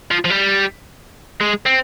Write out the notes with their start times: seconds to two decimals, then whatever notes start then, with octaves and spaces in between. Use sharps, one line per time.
0.11 F3
0.25 F3
0.30 G3
1.41 G#3
1.66 C4